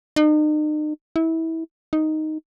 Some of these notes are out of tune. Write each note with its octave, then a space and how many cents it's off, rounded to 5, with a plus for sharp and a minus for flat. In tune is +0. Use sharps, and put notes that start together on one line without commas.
D#4 -40
E4 -25
D#4 +0